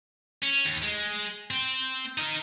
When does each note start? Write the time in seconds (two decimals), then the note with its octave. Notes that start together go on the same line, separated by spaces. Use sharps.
0.43 C#4
0.66 D#2
0.82 G#3
1.51 C4
2.18 D#4 A#4